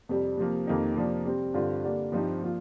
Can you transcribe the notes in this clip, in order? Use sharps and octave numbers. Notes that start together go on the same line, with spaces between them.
F2 C3 G3
C3 F3 A#3
F2 D#3 A#3 D#4 G4
C3 F3 A#3 D4
C3 G3 C4
G2 D3 G3 C4 F4
D3 G3 A#3 D4
G2 F3 C4 D#4 G4
F3 A#3 F4